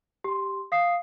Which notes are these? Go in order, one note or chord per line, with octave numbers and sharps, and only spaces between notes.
G4 C6
F5 D#6 C7